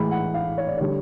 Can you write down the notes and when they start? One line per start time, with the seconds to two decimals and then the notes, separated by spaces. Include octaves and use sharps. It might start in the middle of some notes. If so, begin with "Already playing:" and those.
Already playing: A2 E3 G#3 B5
0.11 F#5
0.34 F5
0.58 C#5
0.67 D5
0.77 D3 G3 C#5